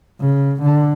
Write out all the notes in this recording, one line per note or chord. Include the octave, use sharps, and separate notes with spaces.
C#3
D3